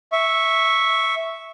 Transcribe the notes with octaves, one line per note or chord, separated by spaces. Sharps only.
E5 C#6